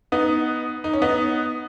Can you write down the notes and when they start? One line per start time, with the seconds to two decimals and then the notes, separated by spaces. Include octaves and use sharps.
0.12 B3 D#4
0.84 D#4
0.93 C#4
1.02 B3 D#4